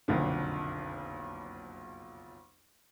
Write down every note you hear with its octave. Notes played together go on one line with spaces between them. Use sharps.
F#1 B1 F2 D3